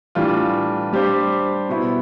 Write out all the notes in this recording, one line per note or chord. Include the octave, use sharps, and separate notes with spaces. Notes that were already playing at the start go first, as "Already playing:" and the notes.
A2 E3 G3 D4 F4
G3 D4 G4 C5
B2 B3 E4